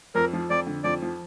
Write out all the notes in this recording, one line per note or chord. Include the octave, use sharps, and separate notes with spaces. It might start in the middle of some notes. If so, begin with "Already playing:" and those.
F2 A#4
F3
F2 D5
D3
F2 D5
F3